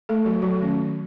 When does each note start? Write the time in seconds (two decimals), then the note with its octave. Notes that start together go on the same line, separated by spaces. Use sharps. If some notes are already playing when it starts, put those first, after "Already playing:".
0.09 A3 A4
0.25 F#3 F#4
0.42 F#3 F#4
0.59 D#3 A3 C#4